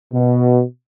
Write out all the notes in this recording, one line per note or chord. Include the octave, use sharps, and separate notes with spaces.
B2